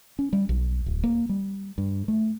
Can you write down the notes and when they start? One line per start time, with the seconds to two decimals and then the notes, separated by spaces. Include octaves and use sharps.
0.19 C#4
0.33 G3
0.49 B1
0.86 D1
1.04 A#3
1.29 G3
1.78 G2
2.08 A3